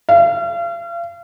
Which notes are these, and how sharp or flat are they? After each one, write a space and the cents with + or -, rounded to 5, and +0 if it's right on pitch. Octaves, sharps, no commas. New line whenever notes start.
F5 -40